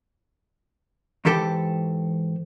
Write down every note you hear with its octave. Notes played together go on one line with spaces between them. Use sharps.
G#2 E3 G4 A4 G5